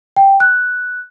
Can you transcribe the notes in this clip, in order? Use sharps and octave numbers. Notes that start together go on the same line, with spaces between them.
G5
F#6